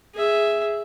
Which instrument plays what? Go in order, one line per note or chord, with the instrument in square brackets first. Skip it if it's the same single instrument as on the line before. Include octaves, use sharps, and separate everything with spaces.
[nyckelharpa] G#4 E5